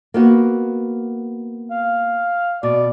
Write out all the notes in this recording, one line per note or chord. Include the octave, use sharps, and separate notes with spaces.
A#3 B3 F#4
F5
B2 D5